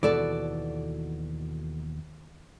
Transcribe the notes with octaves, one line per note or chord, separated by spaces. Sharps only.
D#2 B2 E3 F#4 A4 D5